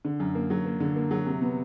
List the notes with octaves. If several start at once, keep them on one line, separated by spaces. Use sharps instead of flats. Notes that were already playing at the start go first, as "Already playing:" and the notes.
D3
F#2
A#3
F#3
A#3
D3
A#3
F#3
C3
B3